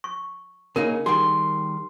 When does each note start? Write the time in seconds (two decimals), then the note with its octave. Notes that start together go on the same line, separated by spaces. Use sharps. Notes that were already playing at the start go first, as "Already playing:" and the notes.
0.04 C#6
0.76 C#3 A#3 D#4 A#4
1.06 D#3 G3 G#4 C6